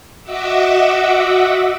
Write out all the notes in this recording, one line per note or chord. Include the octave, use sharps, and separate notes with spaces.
F#4 D#5 E5 F#5 D6 E6